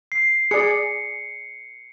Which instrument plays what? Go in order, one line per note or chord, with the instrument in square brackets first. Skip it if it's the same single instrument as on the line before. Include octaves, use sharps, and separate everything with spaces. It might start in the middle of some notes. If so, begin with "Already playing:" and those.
[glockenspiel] C7
[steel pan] G#4 D5 [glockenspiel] C#7